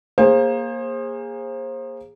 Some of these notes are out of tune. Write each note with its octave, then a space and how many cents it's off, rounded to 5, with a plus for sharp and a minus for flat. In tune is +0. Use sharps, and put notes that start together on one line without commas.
A#3 +10 G#4 -20 C5 +30